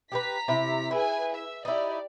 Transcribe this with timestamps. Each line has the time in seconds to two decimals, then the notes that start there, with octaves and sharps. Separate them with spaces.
0.12 G4 G#4 B4 A#5 B6
0.48 C3 E4
0.91 E4 G#4 B4 G#5
1.34 E5
1.65 D#4 E4 G4 D5